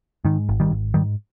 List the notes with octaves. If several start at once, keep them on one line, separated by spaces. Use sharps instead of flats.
G#2 D#3
G#1
D#3 G3
G#1
G#2 D#3 G3